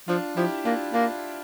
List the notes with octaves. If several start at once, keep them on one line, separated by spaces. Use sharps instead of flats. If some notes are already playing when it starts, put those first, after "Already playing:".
F3 D4 F4
F3 E4 G4
A#3 D4 F4
A#3 D4 F4